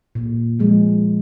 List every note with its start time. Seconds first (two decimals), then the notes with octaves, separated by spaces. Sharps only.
0.15 A#2
0.59 F3 G#3